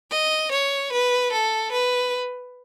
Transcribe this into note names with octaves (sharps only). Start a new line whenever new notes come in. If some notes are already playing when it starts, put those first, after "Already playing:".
D#5
C#5
B4
A4
B4